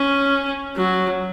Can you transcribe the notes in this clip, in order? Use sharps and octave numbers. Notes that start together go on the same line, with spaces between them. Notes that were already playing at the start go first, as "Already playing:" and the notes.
Already playing: C#4
F#3